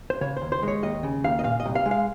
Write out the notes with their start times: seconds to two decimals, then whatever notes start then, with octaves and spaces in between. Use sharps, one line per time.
0.10 C5
0.21 C#3 C#5
0.37 C5
0.42 D#2
0.52 C5
0.63 G#3 C#5
0.83 D#2 D#5
1.03 C#3
1.24 D#2 F5
1.39 D#5
1.44 A#2 F5
1.60 D#5
1.66 C2
1.75 F5
1.85 G#3
1.91 F5